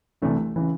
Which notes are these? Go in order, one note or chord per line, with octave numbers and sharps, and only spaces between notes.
C2 C3 E3 A3 D4
C#3 E3